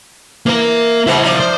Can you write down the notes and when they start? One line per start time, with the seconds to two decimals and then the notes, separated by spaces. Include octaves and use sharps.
0.46 E3 A#3 A#4
1.07 G#2 E3 B3 E4 C5
1.22 F3 D#4 D5
1.40 C5